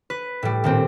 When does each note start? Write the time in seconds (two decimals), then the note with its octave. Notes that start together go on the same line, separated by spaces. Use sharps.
0.10 B4
0.43 A2 G3
0.64 D#1 A#2 C4